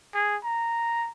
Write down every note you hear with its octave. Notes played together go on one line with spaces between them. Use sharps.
G#4
A#5